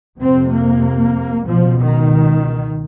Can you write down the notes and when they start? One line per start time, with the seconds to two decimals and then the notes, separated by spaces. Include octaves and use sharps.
0.20 F2 C3 C4
0.52 A#3
1.47 C#2 B2 F3
1.79 D#3